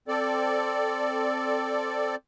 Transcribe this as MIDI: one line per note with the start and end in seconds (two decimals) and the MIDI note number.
0.08 2.15 60
0.08 2.15 69
0.08 2.15 74